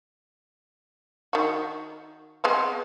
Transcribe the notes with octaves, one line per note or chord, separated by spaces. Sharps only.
D#3 F#4
G#3 B3 C4